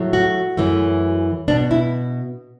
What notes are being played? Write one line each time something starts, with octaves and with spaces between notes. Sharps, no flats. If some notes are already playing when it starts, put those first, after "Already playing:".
Already playing: A2 F#3 A3
F#4
F#2 E3 A3
B2 B3 D4
E4